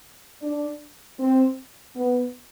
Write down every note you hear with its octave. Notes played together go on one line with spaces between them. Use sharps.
D4
C4
B3